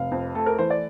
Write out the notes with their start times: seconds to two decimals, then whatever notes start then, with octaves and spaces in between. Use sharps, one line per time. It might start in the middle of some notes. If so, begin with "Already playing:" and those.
Already playing: F1 F5
0.12 F2
0.35 A3 A4
0.46 A#4
0.58 E3 C5
0.70 D5